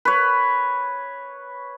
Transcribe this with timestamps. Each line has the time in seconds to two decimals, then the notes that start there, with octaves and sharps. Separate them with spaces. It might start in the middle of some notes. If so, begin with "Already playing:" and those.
0.05 B4 C#5